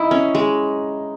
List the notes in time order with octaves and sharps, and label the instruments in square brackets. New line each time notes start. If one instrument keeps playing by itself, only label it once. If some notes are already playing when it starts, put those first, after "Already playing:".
Already playing: [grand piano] D#4 [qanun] E4
[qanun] C#4
G#3